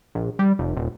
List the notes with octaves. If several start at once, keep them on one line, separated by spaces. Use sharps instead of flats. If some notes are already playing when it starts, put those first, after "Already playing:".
A#1
G3
F1
D#1